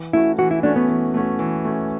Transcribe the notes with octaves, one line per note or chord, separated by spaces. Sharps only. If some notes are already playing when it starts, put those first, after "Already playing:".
Already playing: E3
A3 C#4 E4 F#4
E3 F#4
E4
A3 C#4 D4 F#4
B3
E3
A3 C#4 F#4
E3
A3 C#4 F#4